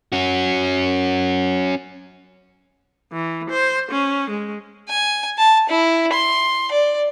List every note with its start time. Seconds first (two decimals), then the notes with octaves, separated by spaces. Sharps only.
0.12 C#4 F#4
3.13 E3
3.50 C5
3.91 C#4
4.30 G#3
4.89 G#5
5.38 A5
5.69 E4
6.13 C6
6.72 D5